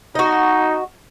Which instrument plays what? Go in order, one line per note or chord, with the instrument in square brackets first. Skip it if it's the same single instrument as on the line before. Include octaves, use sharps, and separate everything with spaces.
[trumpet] D#4 [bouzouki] F#4 D#5